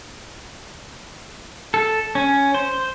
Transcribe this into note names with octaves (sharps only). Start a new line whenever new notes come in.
A4
C#4
C5